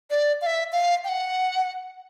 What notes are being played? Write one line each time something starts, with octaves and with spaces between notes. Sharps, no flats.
D5
F5
E5
F5
G5
F#5